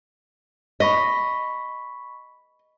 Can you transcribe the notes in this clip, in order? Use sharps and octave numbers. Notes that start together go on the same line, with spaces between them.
D#5 B5 C#6 B6